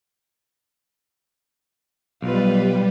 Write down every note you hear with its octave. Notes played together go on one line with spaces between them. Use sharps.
B1 G3 F4 B4